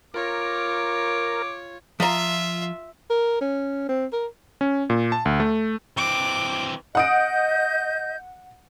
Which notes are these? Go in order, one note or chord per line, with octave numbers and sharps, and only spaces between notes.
F4 A#4 C#5 D6
F3 F4 E5 A#5
A#4
C#4
C4
A#4
C#4
A#2
A5
D2
A3
E3 C4 D6
D#5 F#5 D#6 G6 D7